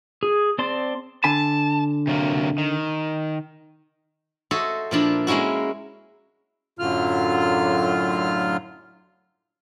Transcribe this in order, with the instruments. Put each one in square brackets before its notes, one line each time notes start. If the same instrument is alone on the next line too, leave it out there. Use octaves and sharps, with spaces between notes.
[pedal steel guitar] G#4
C4 D5 A5 C6
[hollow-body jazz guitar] D3 G#5 B5 [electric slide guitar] A5
[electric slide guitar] C3 F#3 A#3
D#3
[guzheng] F#4 A4 C5 C#5 D#5 E5
A#2 F3 D4 E4
G#3 A#3 C#4 E4 F#4
[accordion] F#2 A2 D3 F#3 F4 F6